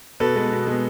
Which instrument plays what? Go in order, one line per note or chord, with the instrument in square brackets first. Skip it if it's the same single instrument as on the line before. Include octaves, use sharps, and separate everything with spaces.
[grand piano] B2 A4 B4
G#3 B3
B2
G#3 B3